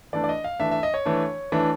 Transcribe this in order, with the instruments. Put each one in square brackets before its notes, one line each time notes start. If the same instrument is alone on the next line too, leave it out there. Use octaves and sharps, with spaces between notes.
[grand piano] E3 A3 D4 D5
D5
D#5
F5
E3 A3 D4 E5
E5
D#5
C#5
E3 A3 D4
E3 A3 D4